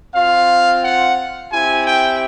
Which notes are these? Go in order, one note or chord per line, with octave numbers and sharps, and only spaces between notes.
C4 F4 F5
F#5
C4 E4 G4 G#5
G5